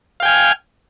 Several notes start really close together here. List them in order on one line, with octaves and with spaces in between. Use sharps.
F5 G5 G#5 F6